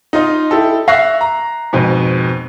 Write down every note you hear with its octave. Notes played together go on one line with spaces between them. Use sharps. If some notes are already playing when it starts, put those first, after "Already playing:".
D#4 F4 D#5
E4 G4 A4
E5 F5 C#6 F#6 A#6 C7
A#5
F2 G#2 B2